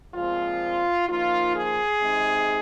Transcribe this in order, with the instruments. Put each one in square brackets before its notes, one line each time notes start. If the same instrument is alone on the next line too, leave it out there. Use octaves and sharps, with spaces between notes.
[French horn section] A#2 F3 G#3 C4 F4
F3 A#3 D#4 F4
G#4
C3 G#3 C4 D#4